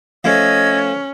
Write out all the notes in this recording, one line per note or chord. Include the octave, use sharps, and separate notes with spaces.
F3 A3 C#4 D#5 E6 G#6